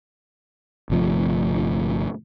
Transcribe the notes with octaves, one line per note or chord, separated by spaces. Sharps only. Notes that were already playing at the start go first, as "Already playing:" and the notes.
G1 C3 F3 A3